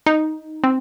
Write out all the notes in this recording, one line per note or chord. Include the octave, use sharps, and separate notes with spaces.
D#4
C4